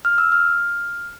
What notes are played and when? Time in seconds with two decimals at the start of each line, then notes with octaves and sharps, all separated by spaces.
0.05 F6
0.18 E6
0.32 F6